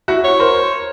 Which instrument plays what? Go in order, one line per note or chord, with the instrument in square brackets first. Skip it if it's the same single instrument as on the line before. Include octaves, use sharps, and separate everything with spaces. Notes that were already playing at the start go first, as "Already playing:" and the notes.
[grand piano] E4 F#4
[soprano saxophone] C#5
[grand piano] A#4 C5